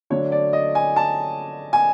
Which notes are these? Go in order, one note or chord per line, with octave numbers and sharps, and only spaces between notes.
D3 F#3 A3 D4 C#5
D5
D#5
G#5
A5
G#5